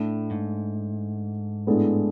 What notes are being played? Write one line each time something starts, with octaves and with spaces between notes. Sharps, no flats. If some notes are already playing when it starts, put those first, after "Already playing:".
Already playing: A2 A3 D4 A4
G#2
A2 G#3 B3 D4 A4